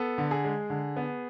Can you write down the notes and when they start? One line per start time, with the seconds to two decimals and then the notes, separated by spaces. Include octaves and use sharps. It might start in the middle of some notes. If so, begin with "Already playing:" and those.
Already playing: B3 A4
0.18 D3
0.31 G#4
0.44 G#3
0.70 D3
0.97 B3